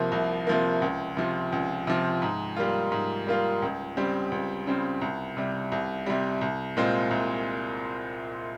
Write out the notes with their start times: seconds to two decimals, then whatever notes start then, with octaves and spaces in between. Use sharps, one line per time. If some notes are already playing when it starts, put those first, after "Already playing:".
Already playing: C2 C3 F3 A#3
0.12 C2
0.47 C3 F3 A#3
0.82 C#2
1.17 C3 F3
1.52 C#2
1.87 C3 F3
2.22 G#2
2.56 G3 A#3 F4
2.92 G#2
3.27 G3 A#3 F4
3.62 C#2
3.97 C#3 G3 C4
4.32 C#2
4.67 C#3 G3 C4
5.01 C2
5.37 C3 G3
5.72 C2
6.06 C3 G3
6.41 C2
6.77 A#2 G#3 C4 F4
7.11 C2